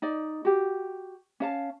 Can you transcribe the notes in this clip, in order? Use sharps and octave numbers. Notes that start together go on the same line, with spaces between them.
D#4 D5 D#5
F#4 G4
C#4 F5 A5